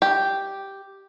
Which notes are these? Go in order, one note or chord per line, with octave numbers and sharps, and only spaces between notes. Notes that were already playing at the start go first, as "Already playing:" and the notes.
G4